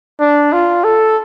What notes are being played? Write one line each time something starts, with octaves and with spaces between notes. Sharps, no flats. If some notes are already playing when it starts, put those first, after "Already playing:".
D4
F4
A4